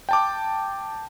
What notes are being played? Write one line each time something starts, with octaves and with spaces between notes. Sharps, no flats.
G5 A5 D6